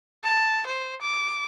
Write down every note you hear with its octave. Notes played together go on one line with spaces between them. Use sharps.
A5
C5
D6